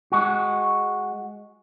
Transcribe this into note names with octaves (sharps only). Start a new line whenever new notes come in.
G#3 F#4